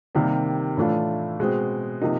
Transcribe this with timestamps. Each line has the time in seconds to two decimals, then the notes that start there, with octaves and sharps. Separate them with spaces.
0.15 C3 D#3 G3 A#3
0.77 A2 E3 A3 D4 F4
1.40 B2 G#3 C4
2.01 C3 F3 A#3 D#4